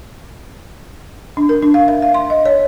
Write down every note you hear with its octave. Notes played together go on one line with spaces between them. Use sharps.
D4
A#4
D4
F5
E5
F5
C6
D#5
C#5